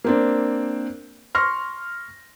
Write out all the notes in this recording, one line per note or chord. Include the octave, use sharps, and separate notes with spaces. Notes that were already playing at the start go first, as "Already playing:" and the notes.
A#3 C4 D4
C6 C#6 F6 A#6